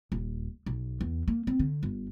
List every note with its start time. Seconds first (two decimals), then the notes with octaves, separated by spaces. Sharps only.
0.12 D#1
0.66 B1
1.01 E2
1.28 A#3
1.47 C4
1.59 D3
1.83 G1